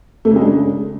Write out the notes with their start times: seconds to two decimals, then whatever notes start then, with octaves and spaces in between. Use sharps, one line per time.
0.25 A3
0.30 C#3
0.36 G#3
0.41 D4
0.47 C#3